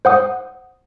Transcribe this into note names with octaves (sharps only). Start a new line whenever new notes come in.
C5 F#5 D#6